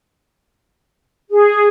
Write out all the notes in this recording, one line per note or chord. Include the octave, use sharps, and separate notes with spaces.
G#4